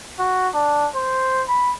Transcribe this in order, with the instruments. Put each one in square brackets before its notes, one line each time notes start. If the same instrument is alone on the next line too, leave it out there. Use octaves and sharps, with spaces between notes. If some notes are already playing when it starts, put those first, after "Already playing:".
[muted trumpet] F#4
D4
C5
B5